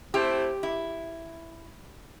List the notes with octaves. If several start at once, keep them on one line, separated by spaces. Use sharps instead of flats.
A3 C4 E4 G4 C5
E4